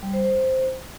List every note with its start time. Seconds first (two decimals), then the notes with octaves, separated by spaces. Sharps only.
0.03 G3
0.13 C5
0.24 C5